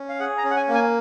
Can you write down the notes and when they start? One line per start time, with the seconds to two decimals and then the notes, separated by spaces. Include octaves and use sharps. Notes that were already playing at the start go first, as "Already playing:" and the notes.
Already playing: C#4
0.09 F5
0.20 G#4 F#5
0.38 A#5
0.44 C#4
0.50 F#5
0.56 G#5
0.68 A#3
0.75 G#5